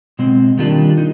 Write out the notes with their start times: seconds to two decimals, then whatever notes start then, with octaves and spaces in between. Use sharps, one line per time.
0.19 B2 G#3 C4
0.58 D#3 G3 A#3 D4 F4
0.98 D#4